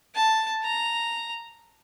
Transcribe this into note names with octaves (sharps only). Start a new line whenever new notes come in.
A5
A#5